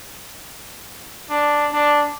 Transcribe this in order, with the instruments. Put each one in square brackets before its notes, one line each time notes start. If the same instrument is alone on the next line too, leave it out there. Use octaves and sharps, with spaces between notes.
[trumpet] D4
D4